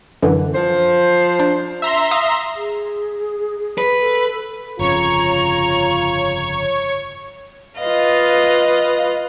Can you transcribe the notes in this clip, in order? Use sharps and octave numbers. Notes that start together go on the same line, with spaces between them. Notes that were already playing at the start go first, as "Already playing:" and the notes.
F#2 D3 E3
F3 C5
D4
E5 A#5 C6
F5 D#6
G#4
B4
A4
G1 F2 C#3 F4 C#5 A#5 C#6
F4 B4 D#5 F5